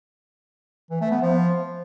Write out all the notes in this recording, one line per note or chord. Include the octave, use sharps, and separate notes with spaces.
E3
A3
B3
F3